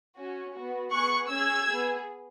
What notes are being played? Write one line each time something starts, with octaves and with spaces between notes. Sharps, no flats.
C#4 F#4
B3 F#4
B3 G#4 C#6 F#6
C#4 G#4 E6 G#6
B3 G#4